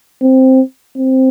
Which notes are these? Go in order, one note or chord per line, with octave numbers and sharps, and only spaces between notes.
C4
C4